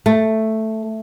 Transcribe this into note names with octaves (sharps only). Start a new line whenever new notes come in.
A3